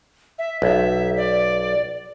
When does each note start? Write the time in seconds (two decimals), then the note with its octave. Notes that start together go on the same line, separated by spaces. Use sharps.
0.39 E5
0.62 B1 E5
1.17 D5